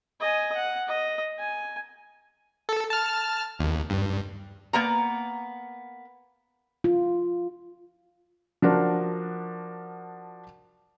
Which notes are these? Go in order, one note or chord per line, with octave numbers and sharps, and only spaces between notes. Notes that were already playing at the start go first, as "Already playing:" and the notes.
D#5 G#5
F#5
D#5
G#5
A4
A5 F6
D#2
G2
A#3 B3 A#5
F4
F3 D4 F#4 A#4